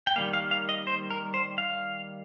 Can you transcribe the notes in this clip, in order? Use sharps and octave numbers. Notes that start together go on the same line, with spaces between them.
G5
D#3 G3 A#3 F5
F5
F5
D#5
C5
A#4
C5
F5